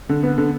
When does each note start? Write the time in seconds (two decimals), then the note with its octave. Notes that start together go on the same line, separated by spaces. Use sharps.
0.09 D3
0.23 B3
0.38 D3